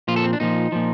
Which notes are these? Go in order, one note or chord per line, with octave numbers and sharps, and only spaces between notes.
A#2 F3 F4
A4
C4
D4
A#2 F3 D#4
A#2 F3